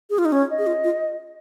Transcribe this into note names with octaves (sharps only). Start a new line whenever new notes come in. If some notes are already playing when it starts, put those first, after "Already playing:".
G#4
F4
D#4
C#4 C#5
D#5
G#4
F4
F4